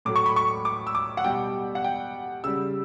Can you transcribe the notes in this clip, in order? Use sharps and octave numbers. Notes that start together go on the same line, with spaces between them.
A2 F#3 A3 D6
C#6
B5
C#6
D6
E6
D6
F#5
B2 G3 G5
F#5
G5
C#3 G3 E6